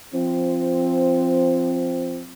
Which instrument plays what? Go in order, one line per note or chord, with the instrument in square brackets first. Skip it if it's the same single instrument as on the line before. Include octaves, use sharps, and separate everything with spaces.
[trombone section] F3 C4